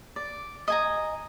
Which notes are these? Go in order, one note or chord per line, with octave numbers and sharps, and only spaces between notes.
D5
D#5 G#5 A#5